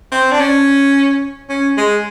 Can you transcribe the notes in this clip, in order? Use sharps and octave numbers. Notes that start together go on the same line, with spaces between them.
C4
D4
C#4
C#4
G#3